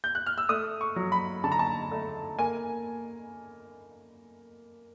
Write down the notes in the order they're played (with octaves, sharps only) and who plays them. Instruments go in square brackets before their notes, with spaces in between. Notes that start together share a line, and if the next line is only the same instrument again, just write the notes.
[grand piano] G6
F#6
F6
E6
A3 D#6
C#6
F#3
B5
D3 A5
A#5
A5
A3
A#3 G#5